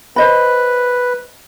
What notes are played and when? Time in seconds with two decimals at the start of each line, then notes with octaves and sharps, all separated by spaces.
0.16 B4 C5 D#5 B5